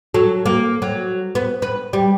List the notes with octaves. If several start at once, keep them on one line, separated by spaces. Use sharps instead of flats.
F#3 A4
A#3
F#3
B3
B4
G3